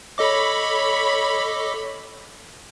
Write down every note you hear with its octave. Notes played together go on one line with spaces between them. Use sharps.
A4 C#5 D#5 B5 D6